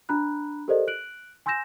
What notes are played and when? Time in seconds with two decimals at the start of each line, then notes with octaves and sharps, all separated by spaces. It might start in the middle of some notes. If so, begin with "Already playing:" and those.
0.09 D4 A#5 B5 F#6
0.68 G4 A4 A#4 C5 D5 D#5
0.88 F#6 D7 F#7
1.46 G#5 C6 E6 G6 A#6 E7